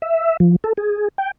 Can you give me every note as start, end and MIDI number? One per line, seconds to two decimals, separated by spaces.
0.02 0.37 76
0.40 0.56 53
0.64 0.73 69
0.77 1.08 68
1.18 1.31 79